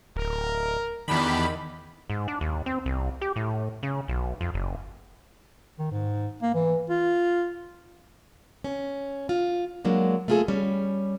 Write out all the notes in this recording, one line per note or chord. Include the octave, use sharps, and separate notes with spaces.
D1 A#4
E2 D#3 D4 G4 B5
G#2
D4
D#2
C4
C2
G4
A2
C#3
B1
F2
F#1
D#3
G#2
A#3
E3
F4
C#4
F4
F#3 G#3 A#3 D4
A3 A#3 F4 F#4 G#4 A4
G3 C#4